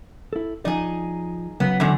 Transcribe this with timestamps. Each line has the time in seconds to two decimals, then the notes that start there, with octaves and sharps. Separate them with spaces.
0.33 E4 A4
0.65 F3 D#4 G#4 D5
1.60 C#3 F#3 B3
1.80 E2 D3